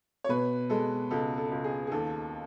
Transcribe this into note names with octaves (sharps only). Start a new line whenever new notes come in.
C#5
B2 B4
G#3 A4
C#2 A4
A4
C#2
G#4
G#4
D#2 A4